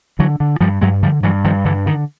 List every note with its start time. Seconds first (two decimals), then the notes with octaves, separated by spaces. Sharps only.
0.19 D3 E3 F#3
0.40 D3
0.61 G2 F3 G3
0.81 G2 F#3 G#3
1.03 D3 F3 G3
1.23 G2 E3 F#3
1.44 G2 D#3 F3
1.65 G2 D3 E3
1.86 D3 D#3